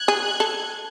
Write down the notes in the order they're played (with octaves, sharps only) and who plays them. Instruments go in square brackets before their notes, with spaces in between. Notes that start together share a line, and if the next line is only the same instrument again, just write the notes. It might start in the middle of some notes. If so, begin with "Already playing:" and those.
Already playing: [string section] F#6 G#6
[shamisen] G#4
A4